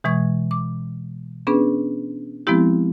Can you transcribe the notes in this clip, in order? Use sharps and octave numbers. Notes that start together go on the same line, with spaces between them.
B2 E3 G#3 C#6 G#6
D6
B3 C#4 D4 G#4 B4
F3 G#3 B3 C4 E4 G4